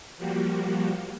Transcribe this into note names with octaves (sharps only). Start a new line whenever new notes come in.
F3 G3 A#3 F#4 G4